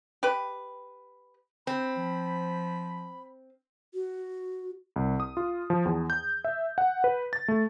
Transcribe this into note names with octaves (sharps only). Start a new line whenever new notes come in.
G4 B4
C4 B5
F3
F#4
C2
D#6
F4
F3
E2
G6
E5
F#5
B4
A6
A3